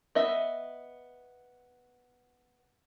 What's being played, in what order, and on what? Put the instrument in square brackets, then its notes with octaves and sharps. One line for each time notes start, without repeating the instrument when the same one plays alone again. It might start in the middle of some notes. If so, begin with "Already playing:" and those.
[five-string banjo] B3 D#5 E5